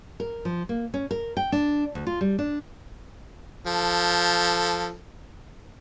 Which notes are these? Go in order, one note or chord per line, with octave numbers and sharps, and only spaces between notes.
A#4
F3
A#3
C#4
A#4
G5
D4
D2
F4
G3
D4
F3 A4